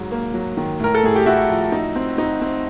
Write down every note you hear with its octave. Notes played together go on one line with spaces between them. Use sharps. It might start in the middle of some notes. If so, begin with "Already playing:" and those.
Already playing: G#2 F#3
A#3
F#3
D#3
A2 A#4
A4
A2 G#4
G4
A2 E4 F#4
F3
D#4
C4
D#4
C4